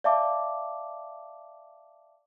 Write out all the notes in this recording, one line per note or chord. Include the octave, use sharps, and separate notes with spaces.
D5 E5 F5 A5 D6